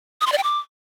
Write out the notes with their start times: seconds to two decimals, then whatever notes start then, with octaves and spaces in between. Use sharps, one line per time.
0.21 D#6
0.27 C6
0.32 D5
0.38 G5
0.43 D6